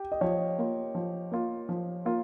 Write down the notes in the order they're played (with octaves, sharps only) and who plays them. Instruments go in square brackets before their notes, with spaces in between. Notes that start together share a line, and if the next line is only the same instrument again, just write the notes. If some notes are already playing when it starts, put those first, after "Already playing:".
Already playing: [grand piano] G4
D#5
[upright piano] F3 [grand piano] C#5
[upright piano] A#3 F4
F3
A#3 F4
F3
A#3 F4